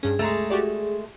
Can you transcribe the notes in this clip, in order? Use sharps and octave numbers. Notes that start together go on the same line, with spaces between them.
G2 C#4 G#4
C#2 G#3 A3 A#5
F#4 G4 D5